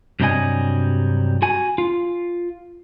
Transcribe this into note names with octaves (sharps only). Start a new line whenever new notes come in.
G2 C3 F#3 G3 D#5 G#5
F#4 G#5
F4